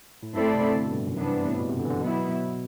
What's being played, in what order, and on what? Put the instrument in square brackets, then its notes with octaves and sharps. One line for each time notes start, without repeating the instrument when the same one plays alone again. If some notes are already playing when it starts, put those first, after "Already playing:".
[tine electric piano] A2
[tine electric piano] G2 [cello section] A3 C4 E4 A4 D5
[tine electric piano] C3
D3
B2
G2
A2
F#2
[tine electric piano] F#2 [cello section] C3 E3 B3 D4
[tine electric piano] G2
A2
B2
C3
D3
E3
D3
[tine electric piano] B2 [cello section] F#3 B3 E4